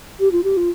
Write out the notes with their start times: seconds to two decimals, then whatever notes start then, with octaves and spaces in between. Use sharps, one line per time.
0.20 G4
0.32 F4
0.44 G4
0.57 F4